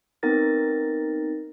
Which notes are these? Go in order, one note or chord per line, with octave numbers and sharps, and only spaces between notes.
B3 C4 D#4 A#4 A6 A#6